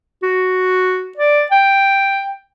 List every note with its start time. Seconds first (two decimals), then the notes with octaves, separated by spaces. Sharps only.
0.23 F#4
1.17 D5
1.52 G5